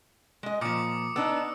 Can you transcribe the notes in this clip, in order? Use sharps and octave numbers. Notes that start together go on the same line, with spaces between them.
G#3 D#5
A#2 F3 D6 D#6 C#7
B3 D4 D#4 E6